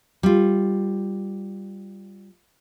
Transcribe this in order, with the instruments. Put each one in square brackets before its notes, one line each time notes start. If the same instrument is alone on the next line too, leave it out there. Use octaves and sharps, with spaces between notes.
[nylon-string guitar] G3 F4